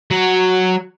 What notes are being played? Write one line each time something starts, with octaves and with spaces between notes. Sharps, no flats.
F#3